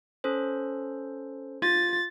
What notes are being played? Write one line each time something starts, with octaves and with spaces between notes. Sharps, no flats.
C#4 A4 C5
F4 A6